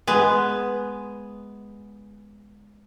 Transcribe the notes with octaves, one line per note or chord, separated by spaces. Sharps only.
G#3 B3